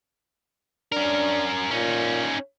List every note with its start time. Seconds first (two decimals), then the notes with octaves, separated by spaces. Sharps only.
0.92 C#4 D4 A#4
1.71 A#2 C#4 D#4